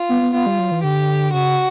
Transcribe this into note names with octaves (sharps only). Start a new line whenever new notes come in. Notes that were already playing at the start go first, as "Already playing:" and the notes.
Already playing: F4
B3
B3
B3 F4
G3
F#3
E3
D3 G4
C#3 F#4